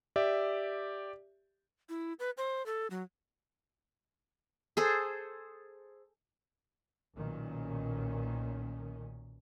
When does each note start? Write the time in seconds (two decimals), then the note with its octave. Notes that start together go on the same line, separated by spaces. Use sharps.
0.16 G4 D5 E5
1.89 E4
2.19 B4
2.37 C5
2.66 A4
2.91 F#3
4.77 G#4 A4 C5
7.16 B1 A#2 D#3 C#4